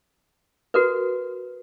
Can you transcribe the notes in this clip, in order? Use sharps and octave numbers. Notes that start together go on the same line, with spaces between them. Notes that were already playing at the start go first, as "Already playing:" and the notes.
F#4 A#4 B4